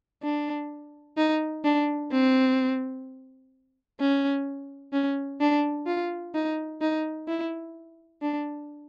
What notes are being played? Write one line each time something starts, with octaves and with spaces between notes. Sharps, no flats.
D4
D#4
D4
C4
C#4
C#4
D4
F4
D#4
D#4
E4
D4